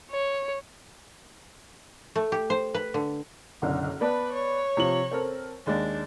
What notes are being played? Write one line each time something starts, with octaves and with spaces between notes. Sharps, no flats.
C#5
A3
G4
C5
B4
D3
F#1 B1 D3
B3 B4 D5 A5
C#5
C3 F3 F#7
C4 A4 A#4
D#2 G#3 D4